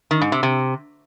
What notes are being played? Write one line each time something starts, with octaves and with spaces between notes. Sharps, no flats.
D#3
G#2
C3
C3